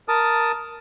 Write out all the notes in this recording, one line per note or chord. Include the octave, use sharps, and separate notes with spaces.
A#4 A5 D#6